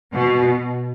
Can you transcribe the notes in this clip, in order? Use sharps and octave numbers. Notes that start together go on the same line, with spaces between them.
B2